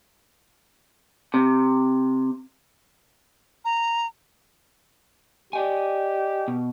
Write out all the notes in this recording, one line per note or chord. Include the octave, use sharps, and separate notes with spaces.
C3
A#5
G4 D5 D#5 G#5
B2